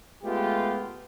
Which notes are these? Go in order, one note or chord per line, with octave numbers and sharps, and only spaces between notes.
G#3 A3 B3 F4 G4